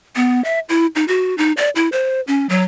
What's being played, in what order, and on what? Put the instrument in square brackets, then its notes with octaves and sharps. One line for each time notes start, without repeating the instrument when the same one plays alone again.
[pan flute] B3
E5
E4
D#4
F#4
D#4
D5
E4
C5
C#4
F#3